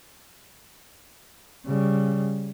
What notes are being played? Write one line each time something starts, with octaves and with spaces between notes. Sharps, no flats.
C#3 G3